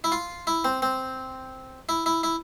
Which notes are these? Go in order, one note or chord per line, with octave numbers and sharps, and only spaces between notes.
E4
F4
E4
C4
C4
E4
E4
E4